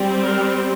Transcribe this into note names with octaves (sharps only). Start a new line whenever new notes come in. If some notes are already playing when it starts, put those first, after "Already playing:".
Already playing: G3 C4
A#4